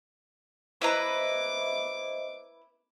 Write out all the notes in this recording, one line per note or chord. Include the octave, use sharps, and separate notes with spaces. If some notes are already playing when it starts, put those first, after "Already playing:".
E4 B4 C5 D#5 E5 A#5 D6